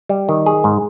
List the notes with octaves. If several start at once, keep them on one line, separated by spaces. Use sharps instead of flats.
G3
D#3
G#4
G#2